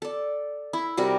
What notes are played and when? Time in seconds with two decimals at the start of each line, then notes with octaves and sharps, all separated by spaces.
0.02 A4 D5
0.73 E4
0.97 C3 G3 F#4 A#4